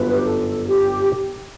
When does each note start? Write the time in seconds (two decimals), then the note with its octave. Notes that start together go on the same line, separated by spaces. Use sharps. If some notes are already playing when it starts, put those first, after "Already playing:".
Already playing: G1 F#2 B4
0.13 G4
0.24 A4
0.68 G4